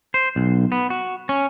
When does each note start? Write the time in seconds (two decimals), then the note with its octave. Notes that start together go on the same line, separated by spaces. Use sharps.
0.14 C5
0.36 B1
0.72 B3
0.90 F#4
1.29 C#4